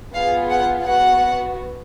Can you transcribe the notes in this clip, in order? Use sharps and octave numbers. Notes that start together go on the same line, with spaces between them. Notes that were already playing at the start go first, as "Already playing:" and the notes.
B3 F4 G#4 F5
F#5
B3 F#4 F#5